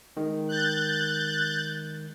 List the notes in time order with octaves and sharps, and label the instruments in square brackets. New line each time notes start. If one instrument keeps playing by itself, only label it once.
[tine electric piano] D#3 G#3
[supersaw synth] F#6 G6 A6